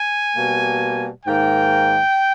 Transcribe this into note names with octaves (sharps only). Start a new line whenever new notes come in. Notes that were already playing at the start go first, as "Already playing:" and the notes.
Already playing: G#5
B2 G3 A#3
G#2 D#3 A#3 G5